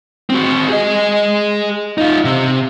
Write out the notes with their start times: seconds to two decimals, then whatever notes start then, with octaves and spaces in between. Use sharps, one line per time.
0.30 C4 F#4
0.69 G#4 D#5
1.98 D#4 F4
2.25 C3